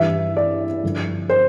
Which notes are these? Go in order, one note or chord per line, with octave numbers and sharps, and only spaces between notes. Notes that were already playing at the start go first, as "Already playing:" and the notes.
Already playing: G2 E3 E5
D5
G2 D3 F3
C5